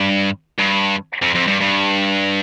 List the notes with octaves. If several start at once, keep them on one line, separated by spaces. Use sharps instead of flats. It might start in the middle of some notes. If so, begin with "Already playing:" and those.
Already playing: G2
G2
F2
F2
G2
G2